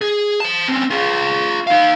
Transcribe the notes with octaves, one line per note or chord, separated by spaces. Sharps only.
G#4
C5 A5
C4 C#4
F4 G#4
D#4 F5